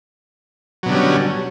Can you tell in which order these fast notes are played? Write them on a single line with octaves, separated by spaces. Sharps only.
F#3 B2 D3 G3 C#4